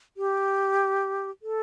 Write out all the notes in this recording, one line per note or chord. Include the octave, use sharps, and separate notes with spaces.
G4
A4